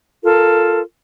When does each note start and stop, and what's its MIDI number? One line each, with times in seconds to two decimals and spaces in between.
0.22 0.80 65
0.22 0.80 69
0.22 0.80 70